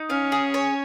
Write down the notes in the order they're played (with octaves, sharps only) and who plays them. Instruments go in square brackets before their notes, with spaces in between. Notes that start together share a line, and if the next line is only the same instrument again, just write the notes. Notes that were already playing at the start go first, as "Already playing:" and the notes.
Already playing: [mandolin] D#4
[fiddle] C#4 [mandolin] F5
[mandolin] G#4
C#5